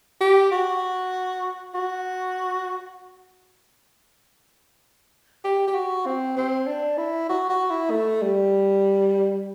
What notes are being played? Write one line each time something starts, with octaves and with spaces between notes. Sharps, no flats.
G4
F#4
F#4
G4
G4
F#4
C4
C4
D4
E4
F#4
F#4
E4
A3
G3